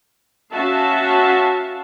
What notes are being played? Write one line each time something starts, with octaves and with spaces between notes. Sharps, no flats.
C#4 F#4 E5 F5 A5